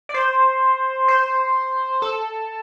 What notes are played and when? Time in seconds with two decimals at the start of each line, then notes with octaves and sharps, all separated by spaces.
0.09 D5
0.14 C5
1.08 C5
2.02 A4